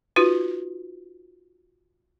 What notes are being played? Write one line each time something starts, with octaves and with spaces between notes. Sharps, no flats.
D#4 F4 F#4 B4